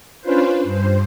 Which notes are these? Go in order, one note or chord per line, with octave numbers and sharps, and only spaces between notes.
C#4 D4 F4 B4 C5
G2 C5